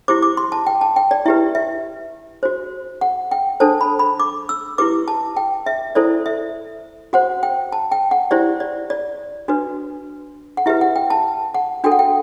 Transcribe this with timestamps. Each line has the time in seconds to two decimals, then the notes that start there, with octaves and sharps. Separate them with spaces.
0.08 E4 G4 C5 D6
0.22 D6
0.37 C6
0.52 A5
0.67 G5
0.81 A5
0.96 G5
1.11 D5
1.26 E4 G4 B4 E5
1.55 E5
2.43 F#4 C5
3.01 F#5
3.31 G5
3.60 D4 A4 C5 A5
3.81 B5
3.99 B5
4.20 D6
4.49 E6
4.78 E4 G4 B4 D6
5.08 A5
5.37 G5
5.66 E5
5.95 E4 A4 C5 D5
6.26 E5
7.13 F#4 C5 F#5
7.43 G5
7.72 A5
7.92 G5
8.11 F#5
8.31 E4 G4 C5 D5
8.60 D5
8.90 D5
9.48 D4 F#4 B4
10.57 F#5
10.66 E4 G4 B4 E5
10.81 F#5
10.96 G5
11.10 A5
11.54 F#5
11.84 D4 F#4 A4 G5
11.92 F#5
11.99 G5